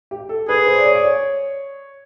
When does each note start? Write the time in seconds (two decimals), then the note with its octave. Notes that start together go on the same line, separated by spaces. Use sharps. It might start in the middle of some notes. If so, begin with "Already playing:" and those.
0.11 G4
0.29 A4
0.48 G#4 B4
0.67 C5
0.78 D5
0.85 C#5
0.95 D5
1.04 C#5